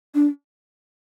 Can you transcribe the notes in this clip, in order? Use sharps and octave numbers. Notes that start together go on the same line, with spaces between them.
D4